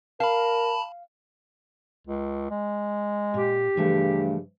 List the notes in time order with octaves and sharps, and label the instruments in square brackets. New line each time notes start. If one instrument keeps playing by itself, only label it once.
[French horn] A#4 [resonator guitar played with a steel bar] F5 [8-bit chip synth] A5 B5
[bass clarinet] C#2
G#3
[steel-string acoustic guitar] A#2 [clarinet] G4
[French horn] G2 [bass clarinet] C#3 [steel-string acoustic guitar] E3 F3 A3